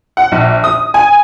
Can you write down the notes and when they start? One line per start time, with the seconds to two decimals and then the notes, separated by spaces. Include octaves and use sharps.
0.17 F#5
0.32 A#1
0.64 D#6
0.94 G#5